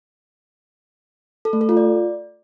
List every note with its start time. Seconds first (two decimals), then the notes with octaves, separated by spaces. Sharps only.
1.45 A4
1.53 A3
1.61 A4
1.69 F4
1.77 D5